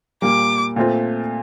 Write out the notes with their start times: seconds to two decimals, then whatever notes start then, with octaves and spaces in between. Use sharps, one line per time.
0.22 A#2 G3 A#3 D6
0.76 A#2 A3 C4 F4